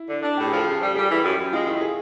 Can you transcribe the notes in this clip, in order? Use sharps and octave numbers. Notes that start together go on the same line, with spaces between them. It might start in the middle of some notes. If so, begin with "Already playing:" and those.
Already playing: E4
D3
D4
A2 G4
G#4
F3 A4
C#3
G3
G3 G#4
E3
F#2 G4
F#2
G#3 F4
D#3 E4
G#4